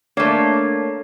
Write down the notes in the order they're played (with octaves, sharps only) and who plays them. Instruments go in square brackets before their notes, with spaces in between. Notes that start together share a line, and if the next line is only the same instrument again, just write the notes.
[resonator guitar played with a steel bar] A3 A#3 [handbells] D4 C#5 D5